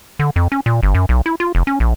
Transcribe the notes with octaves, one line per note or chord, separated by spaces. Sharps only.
D3
F2
C#4
A#2
G1
F#2
B1
E4
F4
F1
C#4
A#1